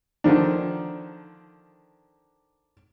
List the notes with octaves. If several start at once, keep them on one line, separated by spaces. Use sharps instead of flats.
D3 D#3 F3 D4